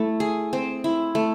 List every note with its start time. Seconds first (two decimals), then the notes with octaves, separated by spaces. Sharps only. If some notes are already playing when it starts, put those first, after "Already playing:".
Already playing: A3 E4
0.20 G#4
0.53 C4
0.84 E4
1.15 A3